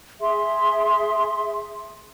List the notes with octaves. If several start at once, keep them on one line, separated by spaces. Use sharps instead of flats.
G#4 E5 C6